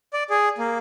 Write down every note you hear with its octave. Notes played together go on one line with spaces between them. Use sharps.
D5
G#4
A#3